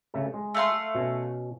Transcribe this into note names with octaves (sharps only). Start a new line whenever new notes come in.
C#3 A3 A4
G#3
A3 F5 C6
B2 C#4